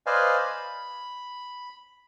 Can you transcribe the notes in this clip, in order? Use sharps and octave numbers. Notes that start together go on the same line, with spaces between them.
B4 C5 D5 D#5 F5 G#5
B5